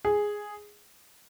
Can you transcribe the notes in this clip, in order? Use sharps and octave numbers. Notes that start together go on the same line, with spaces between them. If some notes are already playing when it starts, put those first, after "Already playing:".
G#4